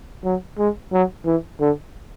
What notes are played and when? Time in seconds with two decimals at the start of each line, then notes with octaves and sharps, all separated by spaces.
0.25 F#3
0.58 G#3
0.93 F#3
1.26 E3
1.60 D3